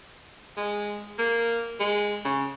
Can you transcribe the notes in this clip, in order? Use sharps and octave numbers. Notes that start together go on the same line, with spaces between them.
G#3
A#3
G#3
C#3